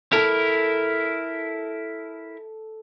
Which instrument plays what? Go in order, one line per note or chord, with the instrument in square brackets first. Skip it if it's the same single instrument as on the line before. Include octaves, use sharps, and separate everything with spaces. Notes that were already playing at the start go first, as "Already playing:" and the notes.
[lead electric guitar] E4 A#4 [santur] A4